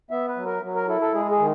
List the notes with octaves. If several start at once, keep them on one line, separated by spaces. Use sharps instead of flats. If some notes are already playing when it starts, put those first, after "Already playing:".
B3 E5
B4
F#3
A#4
F#3
A#4
E4 A4
A4
G#3 G#4
G#4
D#3